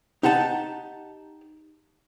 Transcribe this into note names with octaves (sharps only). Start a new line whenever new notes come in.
D#4 G4 F#5 A5